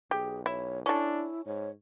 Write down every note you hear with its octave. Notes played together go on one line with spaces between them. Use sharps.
B1 G4 G#4
E4 C#5
C#4 D4 E4 A4
G#2 C#5